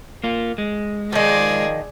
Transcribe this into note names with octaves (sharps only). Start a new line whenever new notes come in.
A#3 F4
G#3
D#3 F3 G#4 D5